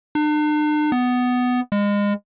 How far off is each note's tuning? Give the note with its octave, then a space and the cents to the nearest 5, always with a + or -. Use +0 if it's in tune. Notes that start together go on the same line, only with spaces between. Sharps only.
D4 +45
B3 +10
G#3 -30